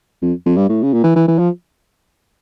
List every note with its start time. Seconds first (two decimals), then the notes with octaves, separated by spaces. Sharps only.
0.22 F2
0.46 F2
0.57 G2
0.69 A2
0.83 C#3
0.93 A#2
1.04 E3
1.16 E3
1.28 E3
1.39 F3